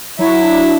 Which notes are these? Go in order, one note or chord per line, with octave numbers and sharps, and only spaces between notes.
F#3 E4
D4